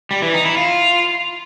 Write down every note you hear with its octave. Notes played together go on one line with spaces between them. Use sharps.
G3
E3
D#4
E4
F4